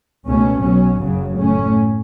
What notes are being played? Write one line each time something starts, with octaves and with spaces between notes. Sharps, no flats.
C#2 B2 A3 C#4
B1 B2 F#3 C#4
F#1 F#2 C#3 F#3
A2 A3 C#4